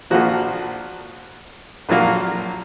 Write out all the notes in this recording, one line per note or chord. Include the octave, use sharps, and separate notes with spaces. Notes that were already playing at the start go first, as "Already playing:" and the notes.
A#1 A#2 F3 A#3 F#4
A#1 A#2 F#3 A#3